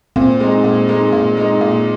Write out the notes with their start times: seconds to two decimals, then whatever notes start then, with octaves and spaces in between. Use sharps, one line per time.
0.16 A#2 C4
0.40 G#3 D#4
0.64 A#2
0.88 G#3 D#4
1.12 A#2
1.37 G#3 D#4
1.61 A#2